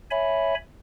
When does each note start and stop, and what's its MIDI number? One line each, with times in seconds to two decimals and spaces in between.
0.11 0.55 73
0.11 0.55 76
0.11 0.55 80
0.11 0.55 83